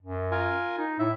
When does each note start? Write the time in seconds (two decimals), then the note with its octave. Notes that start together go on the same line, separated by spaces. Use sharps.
0.02 F#2
0.31 F4 A#4 G#5
0.77 D#4
0.99 A2 E4 E5